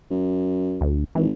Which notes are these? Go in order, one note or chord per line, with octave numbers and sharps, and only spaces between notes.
F#2
D2
G#1 E3